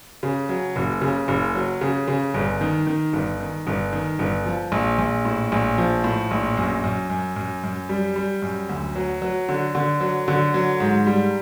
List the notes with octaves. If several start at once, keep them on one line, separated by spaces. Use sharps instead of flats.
C#3
F#3
F#1
C#3
F#1
F#3
C#3
C#3
G1
D#3
D#3
G1
D#3
G1
D#3
G1
F3
A#1
A#1
A2
A#1
F3
A2
A#1
F#2
F#2
F#2
F#2
F#2
G3
G3
F#2
D2
F#3
F#3
D3
D3
F#3
D3
F#3
G#2
G3